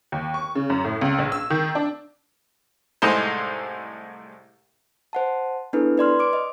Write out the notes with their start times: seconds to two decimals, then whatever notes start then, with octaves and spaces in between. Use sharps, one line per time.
0.12 D#2
0.34 C#6
0.55 C#3
0.70 F#2
0.84 A2
1.01 C#2
1.19 A#1
1.32 E6
1.50 D#3
1.75 D4
3.02 C2 A2 G#3 D#4 A4 C5
5.13 C5 F#5 A5
5.73 B3 D4 E4 G#4 A4 B4
5.98 B4 D5 C6 F6
6.19 D6 D7
6.33 D#5